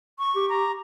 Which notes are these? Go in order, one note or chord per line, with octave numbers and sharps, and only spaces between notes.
C#6
G4
A#5